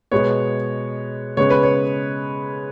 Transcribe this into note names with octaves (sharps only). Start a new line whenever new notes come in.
B2 G#3 B3 C#5
C#3 G#3 B3 C#5
B4
C#5